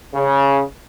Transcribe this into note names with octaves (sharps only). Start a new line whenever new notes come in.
C#3